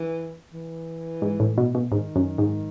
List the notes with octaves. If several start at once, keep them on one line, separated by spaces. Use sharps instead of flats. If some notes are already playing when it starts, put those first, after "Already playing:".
Already playing: E3
E3
G#2
A2
B2
B2
G#2 D#3
F#2
G#2